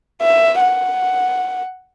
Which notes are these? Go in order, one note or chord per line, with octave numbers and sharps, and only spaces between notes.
E5
F#5